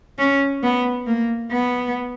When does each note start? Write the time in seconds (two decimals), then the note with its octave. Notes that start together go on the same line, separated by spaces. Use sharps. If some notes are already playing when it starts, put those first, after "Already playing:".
0.18 C#4
0.63 B3
1.07 A#3
1.52 B3